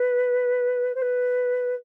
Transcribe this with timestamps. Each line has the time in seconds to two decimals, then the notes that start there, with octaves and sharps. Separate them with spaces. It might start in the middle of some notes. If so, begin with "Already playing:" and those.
Already playing: B4
0.95 C5
1.01 B4